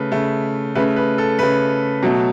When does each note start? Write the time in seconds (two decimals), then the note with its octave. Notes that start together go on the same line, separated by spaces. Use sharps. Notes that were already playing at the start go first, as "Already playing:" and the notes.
Already playing: C#3 A3 B4
0.12 C#3 A3
0.75 C#3 A3 B4
0.96 B4
1.18 A4
1.39 C#3 A3 B4
2.03 B2 F#3 A3